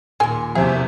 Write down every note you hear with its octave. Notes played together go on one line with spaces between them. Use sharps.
D#2 A#2 G#4 G#5
E2 C3 F3 G#4 E5